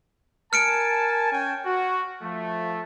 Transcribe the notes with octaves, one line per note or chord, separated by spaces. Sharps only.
A#4 G#5 A5 F6 C#7 D7
C#4 G5 G#5
F#4
F3 A3